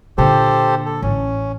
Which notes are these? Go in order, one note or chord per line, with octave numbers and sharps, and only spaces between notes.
A#2 D3 G4 A4 C5
A4
A1 C#4